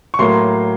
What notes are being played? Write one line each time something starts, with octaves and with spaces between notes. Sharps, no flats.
C#6
A2 F#3 A#3 C6